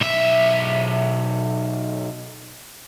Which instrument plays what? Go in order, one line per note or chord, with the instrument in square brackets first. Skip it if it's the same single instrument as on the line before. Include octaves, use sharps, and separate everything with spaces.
[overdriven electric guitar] B1 E5